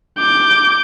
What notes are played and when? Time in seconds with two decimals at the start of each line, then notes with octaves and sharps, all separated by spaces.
0.19 D6 G6